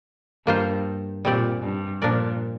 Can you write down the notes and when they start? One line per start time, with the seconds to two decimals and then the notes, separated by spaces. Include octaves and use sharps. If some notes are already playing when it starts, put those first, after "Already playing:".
0.47 G2 A#3 F4 C5
1.25 A#2 G3 C4 G4 D5
1.63 G2
2.02 A#2 F3 D4 A#4 D5